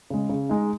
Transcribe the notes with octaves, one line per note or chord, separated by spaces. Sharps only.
C#3 G#3
C#3
G#3 D#4